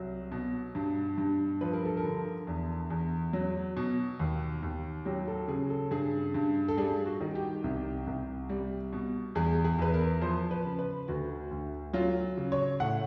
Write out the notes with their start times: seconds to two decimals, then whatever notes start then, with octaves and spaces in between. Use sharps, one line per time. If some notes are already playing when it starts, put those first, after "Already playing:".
Already playing: C2 F#3
0.32 B2
0.75 G2
1.18 G2
1.61 F3 B4
1.73 A#4
1.85 A4
1.97 A#4
2.04 D3
2.47 E2
2.90 E2
3.33 F#3
3.77 B2
4.19 D#2
4.63 D#2
5.05 F#3 G4
5.28 A4
5.48 C#3 G#4
5.70 A4
5.91 G2 G#4
6.34 G2
6.68 A4
6.77 G3 G#4
7.06 F#4
7.21 D#3
7.35 G4
7.64 C2
8.07 C2
8.49 G3
8.93 B2
9.35 E2 G#4
9.65 G#4
9.79 E2 B4
9.94 A#4
10.21 F3 C5
10.51 B4
10.65 C#3
10.79 B4
11.08 D2 F#4
11.51 D2
11.93 F#3 F4
12.37 C#3
12.52 C#5
12.80 A2 F#5